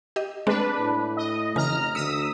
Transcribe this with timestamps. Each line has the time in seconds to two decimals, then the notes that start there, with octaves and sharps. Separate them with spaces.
0.16 G4 D#5
0.47 G#3 A3 C4 D4 B4
0.78 A2
1.17 D#5
1.56 F1 C#3 E3 G#5 A#5 F6
1.95 D2 D#6 E6 B6 C#7